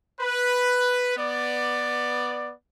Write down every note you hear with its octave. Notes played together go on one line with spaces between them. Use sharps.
B4
B3 D5